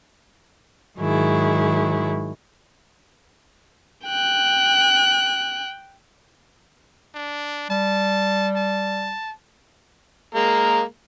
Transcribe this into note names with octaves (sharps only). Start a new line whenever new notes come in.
G#2 D#3 F#3 E4 G#4
G5 F#6
D4
G3 A5
A5
G#3 A#3 A#4